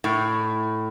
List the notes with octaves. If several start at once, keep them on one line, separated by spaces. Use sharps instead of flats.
A2